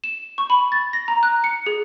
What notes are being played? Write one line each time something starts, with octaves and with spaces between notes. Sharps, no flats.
E7
C#6
B5
A6
A#6
A#5
F#6
C#7
G#4